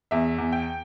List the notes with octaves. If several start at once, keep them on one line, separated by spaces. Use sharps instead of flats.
E2 E5
E2
G5